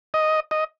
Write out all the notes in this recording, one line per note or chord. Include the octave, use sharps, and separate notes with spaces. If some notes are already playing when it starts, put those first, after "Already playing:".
D#5
D#5